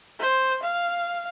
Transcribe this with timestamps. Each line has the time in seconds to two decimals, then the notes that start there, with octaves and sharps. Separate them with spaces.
0.20 C5
0.64 F5